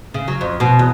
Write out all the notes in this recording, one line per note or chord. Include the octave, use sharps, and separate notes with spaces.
C#3
F#3
F2
B2
E2